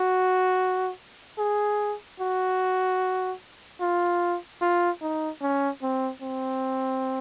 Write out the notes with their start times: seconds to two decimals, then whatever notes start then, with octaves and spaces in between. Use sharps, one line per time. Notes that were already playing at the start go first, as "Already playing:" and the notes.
Already playing: F#4
1.38 G#4
2.20 F#4
3.81 F4
4.62 F4
5.02 D#4
5.41 C#4
5.83 C4
6.22 C4